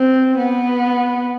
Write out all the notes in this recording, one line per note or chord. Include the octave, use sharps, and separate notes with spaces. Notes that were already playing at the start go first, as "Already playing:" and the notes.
Already playing: C4
B3